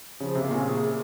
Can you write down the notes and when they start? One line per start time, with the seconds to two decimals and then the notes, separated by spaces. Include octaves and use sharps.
0.20 C#3 F3
0.35 C3 A#3
0.51 A#2 C#4
0.66 G#4